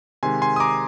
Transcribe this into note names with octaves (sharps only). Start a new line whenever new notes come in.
C3 D#3 G#3 G#5 C6
G#5 C6
D#6
A#5 D6